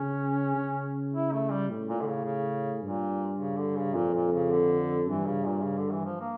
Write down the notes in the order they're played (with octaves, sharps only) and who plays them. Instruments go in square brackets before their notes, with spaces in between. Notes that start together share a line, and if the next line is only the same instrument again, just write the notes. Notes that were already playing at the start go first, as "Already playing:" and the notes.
Already playing: [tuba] C#3 [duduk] C#4
[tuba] C#3
[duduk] E4
A3
G3
[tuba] A2
[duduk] A#2
D3
C#3
C#3
[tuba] G2 [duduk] A#2
[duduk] C#3
D3
C#3
[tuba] F2 [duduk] A#2
[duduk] A#2
C#3
D3
[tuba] G2 [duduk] E3
[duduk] C#3
A#2
C#3
D3
E3
F3
A#3